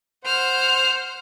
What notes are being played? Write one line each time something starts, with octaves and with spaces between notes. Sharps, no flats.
C5 F#5 F6